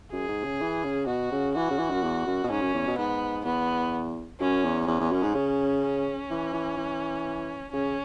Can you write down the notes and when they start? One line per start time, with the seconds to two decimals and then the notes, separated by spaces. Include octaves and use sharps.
0.12 F#2 G#4
0.29 G#2
0.44 C#3
0.61 E3
0.84 C#3
1.07 B2 F#4
1.32 C#3
1.55 E3 F#4
1.71 C#3
1.78 E3
1.90 F#2
2.03 E2
2.27 F#2
2.44 B2
2.50 G#2 C#4
2.61 F#2
2.74 E2
2.87 B2
2.98 G#2 B3
3.45 E2 B3
4.40 F#2 C#4
4.64 E2
4.87 E2 C#4
5.00 E2
5.12 F#2
5.23 G#2
5.35 C#3
5.83 C#4
6.31 E3
6.54 E3
6.77 E3
7.72 C#3 C#4